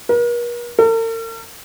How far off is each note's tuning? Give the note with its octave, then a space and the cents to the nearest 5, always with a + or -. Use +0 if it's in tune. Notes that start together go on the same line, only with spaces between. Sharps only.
A#4 +45
A#4 -45